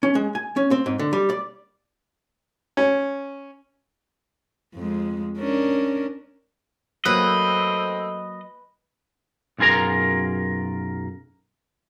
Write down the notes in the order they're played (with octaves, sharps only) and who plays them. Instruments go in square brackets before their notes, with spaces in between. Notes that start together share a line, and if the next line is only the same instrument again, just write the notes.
[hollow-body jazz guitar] C#4
G#3
G#5
C#4
C4
G#2
D3
G3
D5
[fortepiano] C#4
[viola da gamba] F2 G#3
C#4 D4 A#4
[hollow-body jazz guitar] F#3 A#3 [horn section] A3 C4 [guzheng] B4 [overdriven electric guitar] D#5
[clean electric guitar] B1 F#2 F4 G#4 A#4 A#5